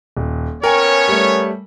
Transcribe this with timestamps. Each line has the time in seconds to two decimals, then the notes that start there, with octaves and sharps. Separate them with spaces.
0.17 D#1
0.63 B3 C#4 A#4 C#5 G5 G#5
1.08 G3 A3